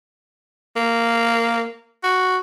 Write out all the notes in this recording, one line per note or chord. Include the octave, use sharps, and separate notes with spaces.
A#3
F#4